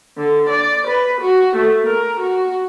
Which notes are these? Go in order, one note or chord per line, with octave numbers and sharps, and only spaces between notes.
D3
D5
B4
F#4
A3
A#4
F#4